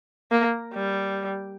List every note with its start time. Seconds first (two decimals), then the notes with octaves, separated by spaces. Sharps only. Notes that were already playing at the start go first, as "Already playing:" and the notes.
0.31 A#3
0.74 G3